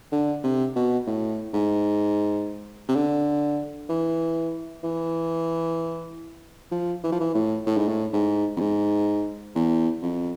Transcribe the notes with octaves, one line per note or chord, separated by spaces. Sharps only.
D3
C3
B2
A2
G#2
C3
D3
E3
E3
F3
E3
F3
E3
A2
A2
G#2
A2
G#2
F2
G#2
E2
F2